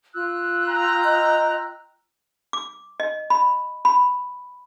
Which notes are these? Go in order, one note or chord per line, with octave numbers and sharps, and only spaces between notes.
F4 E6 F#6
G5 A#5
D#5
D6
D#5
B5
B5